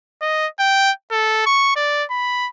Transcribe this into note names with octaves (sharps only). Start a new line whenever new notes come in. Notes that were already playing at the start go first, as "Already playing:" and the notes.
D#5
G5
A4
C#6
D5
B5